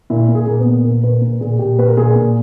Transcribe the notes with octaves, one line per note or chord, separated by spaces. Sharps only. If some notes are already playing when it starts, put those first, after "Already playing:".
A#2 E4
A#2
G#4
A#2 A#3
B3
A#2
A#2 A#4
A#2 B4
A#2 A#4
A#2 G#4
A#2 G4
A#2 B4
A#4
A#2 G#4
A#2